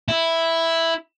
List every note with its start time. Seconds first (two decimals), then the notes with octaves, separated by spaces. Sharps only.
0.08 E4